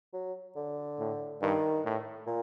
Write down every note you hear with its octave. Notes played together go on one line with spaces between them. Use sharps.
F#3
D3
A2
G2 D#3
A2
A#2